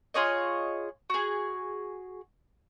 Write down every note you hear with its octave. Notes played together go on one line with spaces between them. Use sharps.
F4 G#4 C#5 D#5
F#4 G#4